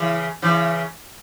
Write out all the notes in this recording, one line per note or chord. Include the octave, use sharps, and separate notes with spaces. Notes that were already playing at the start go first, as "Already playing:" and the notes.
Already playing: C#3 E3
C#3 E3